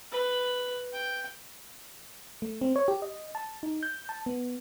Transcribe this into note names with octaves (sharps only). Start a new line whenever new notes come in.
B4
G5
A3
C4
C#5
G4
D#5
A5
D#4
G6
A5
B3